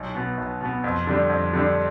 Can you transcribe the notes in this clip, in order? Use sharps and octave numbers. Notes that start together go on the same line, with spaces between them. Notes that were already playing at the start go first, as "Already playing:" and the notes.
Already playing: B1
B2 B3
B1
B2 B3
F2
D3 G3 D4
F2
D3 G3 D4